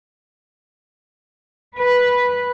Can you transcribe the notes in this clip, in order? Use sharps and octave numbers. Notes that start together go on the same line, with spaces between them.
B4